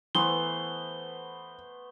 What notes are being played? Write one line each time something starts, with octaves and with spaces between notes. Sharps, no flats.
E3 A3 B3 C5 G7